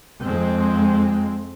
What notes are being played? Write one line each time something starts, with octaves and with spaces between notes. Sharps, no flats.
F2 G#3 C4